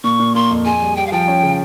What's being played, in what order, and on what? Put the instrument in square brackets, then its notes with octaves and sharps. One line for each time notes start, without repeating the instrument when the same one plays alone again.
[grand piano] A#2 [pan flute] C#6
[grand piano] A#2
[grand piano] A#3 [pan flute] C6
[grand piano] F2
[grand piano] G#4 [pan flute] G#5
[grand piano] G3
[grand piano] G4 [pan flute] G5
[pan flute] F5
[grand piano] F3 [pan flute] G5
[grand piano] C#4
C#3